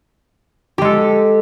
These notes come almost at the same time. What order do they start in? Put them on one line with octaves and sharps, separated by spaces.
G4 G#3 A4